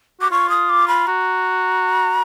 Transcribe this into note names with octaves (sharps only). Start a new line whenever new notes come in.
F#4 D6
F4 C#6
D#6
D6
B5
F#4 A#5